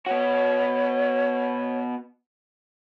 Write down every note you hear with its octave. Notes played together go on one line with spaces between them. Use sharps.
B3 F#4 C#5